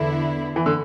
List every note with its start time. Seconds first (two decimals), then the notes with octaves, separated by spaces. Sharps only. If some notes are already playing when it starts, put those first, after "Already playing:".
Already playing: E2 D3 B3 E4
0.56 E3
0.66 D3